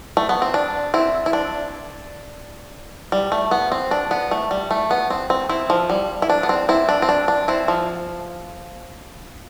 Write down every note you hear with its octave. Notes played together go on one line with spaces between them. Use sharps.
A3
B3
C4
D4
C4 E4
E4
D4
G3
A3
B3
C4
D4
B3
A3
G3
A3
B3
C4
C4
C4 E4
F3
G3
E4
D4
B3
C4
C4 E4
D4
C4
D4
D4
C4 E4
F3